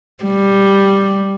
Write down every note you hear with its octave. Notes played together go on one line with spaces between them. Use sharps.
G3